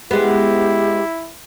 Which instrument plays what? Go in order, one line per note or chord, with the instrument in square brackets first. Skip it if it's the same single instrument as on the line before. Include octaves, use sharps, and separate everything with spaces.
[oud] G#3 B3 [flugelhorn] E4 [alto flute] G4